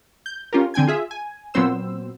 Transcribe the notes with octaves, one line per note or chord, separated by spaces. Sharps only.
G6
C#4 F4 G4 A#4
D3 C4 G5 G#5 G#6
F4 G#4 E5
G#5
A#2 F#3 B3 C4 C5 E6